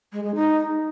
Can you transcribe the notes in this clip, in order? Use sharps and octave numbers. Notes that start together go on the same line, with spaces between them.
G#3
G#3
D#4